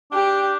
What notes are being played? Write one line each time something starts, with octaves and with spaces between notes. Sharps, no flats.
D4 G4